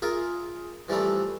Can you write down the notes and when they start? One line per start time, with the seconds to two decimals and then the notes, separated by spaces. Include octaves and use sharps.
0.02 F4 G#4 A#4 E5
0.89 E3 F3 G3 A3 C4